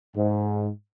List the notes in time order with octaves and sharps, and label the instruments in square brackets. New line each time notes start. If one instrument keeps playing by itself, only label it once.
[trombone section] G#2